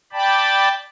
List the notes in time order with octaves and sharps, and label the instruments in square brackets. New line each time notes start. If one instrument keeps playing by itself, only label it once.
[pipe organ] D5 G5 A5 B5